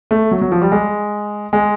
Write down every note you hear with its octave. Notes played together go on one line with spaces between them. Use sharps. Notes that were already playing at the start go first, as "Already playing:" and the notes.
A3
F#3
F#3
F3
G3
G#3
G#3